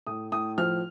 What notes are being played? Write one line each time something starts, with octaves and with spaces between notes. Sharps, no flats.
A2 D#6
A2 D#6
F3 F6